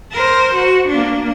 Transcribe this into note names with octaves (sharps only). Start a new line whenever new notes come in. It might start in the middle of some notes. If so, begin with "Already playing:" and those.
A#4 C5
F#4
A#3 D4